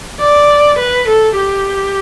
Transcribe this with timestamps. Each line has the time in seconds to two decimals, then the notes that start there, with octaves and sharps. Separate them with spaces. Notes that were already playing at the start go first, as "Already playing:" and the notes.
0.20 D5
0.79 B4
1.08 A4
1.38 G4